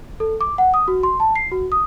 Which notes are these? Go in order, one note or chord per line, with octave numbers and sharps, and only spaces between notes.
A4
D6
F#5
D#6
F#4
C6
A5
C7
F#4
D#6